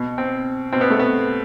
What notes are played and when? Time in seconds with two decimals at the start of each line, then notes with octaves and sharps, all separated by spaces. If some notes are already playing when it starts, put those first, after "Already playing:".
Already playing: B2
0.18 C4
0.73 B2 C4
0.81 B3
0.90 A3
0.99 B3